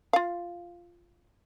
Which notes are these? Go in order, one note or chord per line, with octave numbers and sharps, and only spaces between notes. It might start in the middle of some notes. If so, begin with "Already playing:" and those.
F4 F5